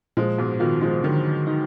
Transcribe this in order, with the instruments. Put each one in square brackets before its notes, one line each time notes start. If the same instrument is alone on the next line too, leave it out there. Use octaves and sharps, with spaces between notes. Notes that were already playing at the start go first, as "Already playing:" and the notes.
[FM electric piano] A#2 [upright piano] F3 G#3
[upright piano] G#2 B2
[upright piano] B2 D#3 [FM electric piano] F4
[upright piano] F3 G#3
[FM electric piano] D3 [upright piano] D#3 F#3
[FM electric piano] D#4